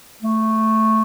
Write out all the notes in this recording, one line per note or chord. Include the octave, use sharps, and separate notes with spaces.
A3